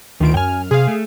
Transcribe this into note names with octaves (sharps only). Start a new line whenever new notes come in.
D2 D#3 F4 D7
F#2 G5 G#5 F6
C3 G#4 F5
A3